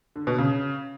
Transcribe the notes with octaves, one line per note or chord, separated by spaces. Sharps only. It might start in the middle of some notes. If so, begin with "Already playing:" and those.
D3
B2
C#3